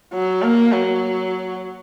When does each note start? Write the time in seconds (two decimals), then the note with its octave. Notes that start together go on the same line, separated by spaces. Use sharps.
0.14 F#3
0.43 A#3
0.72 F#3